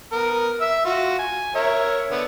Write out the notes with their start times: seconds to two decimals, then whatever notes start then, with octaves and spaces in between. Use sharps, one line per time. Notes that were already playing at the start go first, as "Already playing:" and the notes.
0.12 B3 A#4
0.61 E5 E6
0.85 F4 F#4
1.19 G#5
1.55 A#4 C#5 E5
2.10 D3 B3